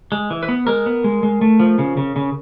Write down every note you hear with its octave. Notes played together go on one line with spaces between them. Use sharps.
G#3
E3
B4
B3
G#3 A#4
B3
G#3
G#3
A3
F3
C#3
C#3
C#3